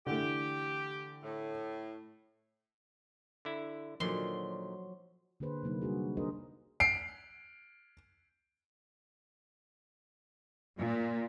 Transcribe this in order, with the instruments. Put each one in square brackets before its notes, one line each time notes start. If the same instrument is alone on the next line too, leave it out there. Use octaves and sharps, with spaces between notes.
[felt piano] D3 E3 A3 [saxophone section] G4
[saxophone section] A2
[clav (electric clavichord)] D3 E4
[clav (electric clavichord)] A#2 D3 D#3 [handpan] F3 F#3 [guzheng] C6
[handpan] D3 A#3 G#4 B4 C5
C3 F#3 A#3 D#4
G3 D4 F#4 G#4
D4 D#4 G#4 A#4 C5 D#5
[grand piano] C7 D7
[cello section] A#2